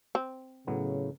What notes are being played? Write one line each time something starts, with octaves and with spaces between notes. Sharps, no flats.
C4
A2 C#3 F#3 B3